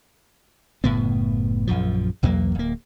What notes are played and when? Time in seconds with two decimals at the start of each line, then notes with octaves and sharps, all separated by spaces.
0.84 F#1 A2 B3
1.67 A#1 F#2 F3
2.23 B1 E2 F#3 A#3
2.55 D1 A#3